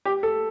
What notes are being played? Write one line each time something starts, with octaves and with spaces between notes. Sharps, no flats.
G4
A4